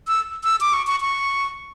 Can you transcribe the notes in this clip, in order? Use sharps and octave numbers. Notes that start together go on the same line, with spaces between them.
E6
E6
D6
C#6
C#6
C#6